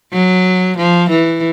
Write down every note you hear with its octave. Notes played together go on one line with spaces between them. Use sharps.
F#3
F3
E3